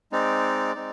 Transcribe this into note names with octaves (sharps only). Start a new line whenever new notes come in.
G#3 C4 D#4 D5
G#3 C4 D#4